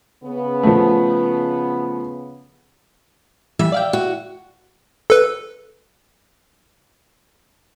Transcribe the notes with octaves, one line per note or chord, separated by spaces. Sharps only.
C#3 B3
F3 A3
E3 G3 E5
D5 F5 G5
F#4
A4 B4